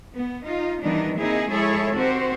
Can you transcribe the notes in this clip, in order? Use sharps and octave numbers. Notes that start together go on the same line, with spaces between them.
B3
D#4 F4
D#3 E3 G3 B3 D4 D#4
A#3 C4 D#4 E4 G#4
F3 G#3 E4 G#4 A4 C#5
D#3 C4 F#4 G4 C5